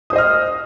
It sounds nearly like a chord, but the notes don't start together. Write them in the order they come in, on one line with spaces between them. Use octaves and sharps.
D#6 C5 D#5 F6